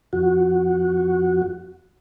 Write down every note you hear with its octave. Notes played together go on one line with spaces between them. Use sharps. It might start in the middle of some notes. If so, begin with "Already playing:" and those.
F2 F#4